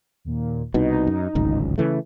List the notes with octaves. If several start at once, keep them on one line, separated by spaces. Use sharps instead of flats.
D#2 A#2
C2 B2 D#4
F#2
D1 G#1 C#2
C#3 E3 A3